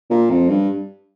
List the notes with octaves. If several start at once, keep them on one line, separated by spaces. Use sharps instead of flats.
A#2
F2
G2